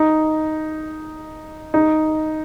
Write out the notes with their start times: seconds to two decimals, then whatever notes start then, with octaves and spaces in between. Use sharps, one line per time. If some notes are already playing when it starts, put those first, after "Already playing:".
Already playing: D#4
1.74 D#4